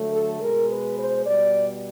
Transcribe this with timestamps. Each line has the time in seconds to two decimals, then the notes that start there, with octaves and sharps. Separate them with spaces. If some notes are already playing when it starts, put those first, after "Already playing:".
Already playing: D3 F#3 A3
0.12 A4
0.41 B2 G#3 A#4
0.68 B4
0.97 C5
1.26 B2 G3 D5